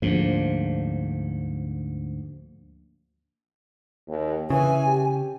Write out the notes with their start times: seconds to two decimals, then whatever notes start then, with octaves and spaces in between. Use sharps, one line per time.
0.02 D2 G#2 F3 A#3 D4
4.08 D#2
4.50 C#3 E3 G#5
4.87 G4